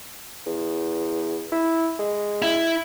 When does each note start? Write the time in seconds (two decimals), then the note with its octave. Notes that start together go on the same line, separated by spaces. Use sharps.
0.46 E2
1.52 E4
1.99 G#3
2.42 E4